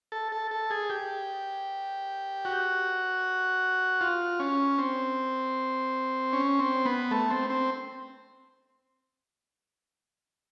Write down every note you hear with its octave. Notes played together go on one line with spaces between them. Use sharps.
A4
A4
A4
G#4
G4
F#4
F4
C#4
C4
C#4
C4
B3
A3
C4
C4